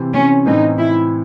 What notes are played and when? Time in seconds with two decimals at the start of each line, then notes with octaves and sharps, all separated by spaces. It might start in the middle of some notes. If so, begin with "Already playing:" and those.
Already playing: C3 E3 C4
0.13 C#4
0.46 A2 E3 C4 D#4
0.78 E4